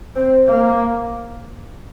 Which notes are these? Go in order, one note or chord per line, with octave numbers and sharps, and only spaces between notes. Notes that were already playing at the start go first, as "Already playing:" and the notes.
C4
A#3